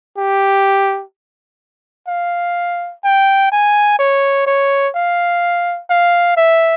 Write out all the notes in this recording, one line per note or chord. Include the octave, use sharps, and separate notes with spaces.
G4
F5
G5
G#5
C#5
C#5
F5
F5
E5